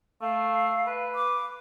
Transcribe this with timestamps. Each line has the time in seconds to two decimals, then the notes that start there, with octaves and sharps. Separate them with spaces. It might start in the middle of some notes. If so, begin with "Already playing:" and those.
0.22 A3 F5
0.87 B4
1.15 D6